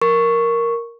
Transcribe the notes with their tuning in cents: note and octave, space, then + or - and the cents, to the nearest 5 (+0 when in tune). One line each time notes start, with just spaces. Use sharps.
A#4 +0 C#6 +0